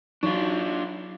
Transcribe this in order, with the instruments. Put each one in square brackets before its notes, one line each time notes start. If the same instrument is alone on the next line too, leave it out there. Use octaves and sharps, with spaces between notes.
[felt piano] F#3 [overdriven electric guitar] D4 F4 [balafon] D#4